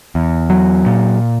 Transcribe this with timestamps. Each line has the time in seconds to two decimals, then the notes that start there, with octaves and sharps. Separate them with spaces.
0.15 E2
0.50 F#3
0.86 A#2